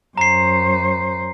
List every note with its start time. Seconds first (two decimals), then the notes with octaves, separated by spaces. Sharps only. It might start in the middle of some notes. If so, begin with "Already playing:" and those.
0.18 F#2 C5 A#5 C7